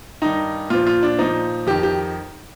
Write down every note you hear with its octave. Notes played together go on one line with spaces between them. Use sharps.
G2 D#3 D#4
A#2 F3 F4
F4
D4
A#2 F3 D#4
F2 D#3 G4
G4